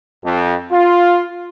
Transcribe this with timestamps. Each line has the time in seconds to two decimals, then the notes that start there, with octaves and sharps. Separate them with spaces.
0.24 F2
0.72 F4